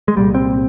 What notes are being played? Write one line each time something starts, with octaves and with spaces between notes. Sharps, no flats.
G#3
C2 A#2 G3
C4